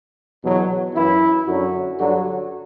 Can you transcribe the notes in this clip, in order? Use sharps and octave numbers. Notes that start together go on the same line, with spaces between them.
E2 B2 F#3
F#2 E3 E4
F#2 D3 F#3 F#4
G2 D3 F#3 F#4